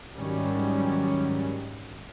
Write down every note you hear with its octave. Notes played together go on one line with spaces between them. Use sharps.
G#2 D#3 F#3 G3 C#4